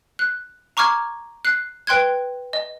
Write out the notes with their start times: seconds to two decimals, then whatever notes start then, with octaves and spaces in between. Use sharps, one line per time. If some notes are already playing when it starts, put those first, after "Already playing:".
0.19 F#6
0.77 A#5 C#6 D6 F6 G#6
1.45 F#6 C7
1.87 B4 G5 C6 F#6 G#6
2.53 D#5